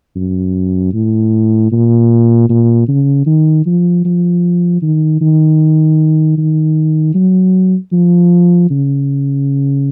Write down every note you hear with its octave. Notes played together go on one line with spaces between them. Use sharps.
F#2
A2
A#2
A#2
C#3
D#3
F3
F3
D#3
D#3
D#3
F#3
F3
C#3